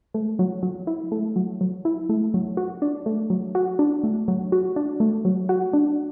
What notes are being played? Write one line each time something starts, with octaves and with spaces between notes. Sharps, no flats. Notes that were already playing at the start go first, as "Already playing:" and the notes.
A3
F#3
F#3
E4
A3
F#3
F#3
E4
A3
F#3
F#4
D4
A3
F#3
F#4
D4
A3
F#3
F#4
D4
A3
F#3
F#4
D4